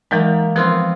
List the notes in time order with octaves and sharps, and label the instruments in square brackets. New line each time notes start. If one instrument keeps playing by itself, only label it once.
[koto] D#3 A#3 [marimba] E3 F#3 G#3
[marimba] F3 [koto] B3 C4 F4